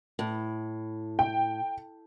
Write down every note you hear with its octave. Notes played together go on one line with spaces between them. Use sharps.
A2
G5